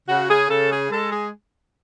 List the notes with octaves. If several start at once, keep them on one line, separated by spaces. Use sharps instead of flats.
C#3 F#4
G#4
C#3 A4
G#4
G#3 A4
G#4